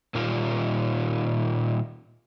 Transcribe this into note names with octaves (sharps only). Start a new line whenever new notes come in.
A#2 D#3 G3 F4